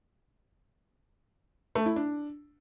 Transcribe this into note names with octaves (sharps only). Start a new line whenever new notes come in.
A3
E4
D4